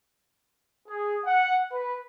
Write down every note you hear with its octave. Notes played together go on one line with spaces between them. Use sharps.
G#4
F#5
B4